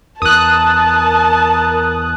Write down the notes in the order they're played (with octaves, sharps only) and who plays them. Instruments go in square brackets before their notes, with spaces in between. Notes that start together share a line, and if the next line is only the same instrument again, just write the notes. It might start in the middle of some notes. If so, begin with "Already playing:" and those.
[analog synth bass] E2 [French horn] A#4 [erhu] A5 [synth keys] D#6 F#6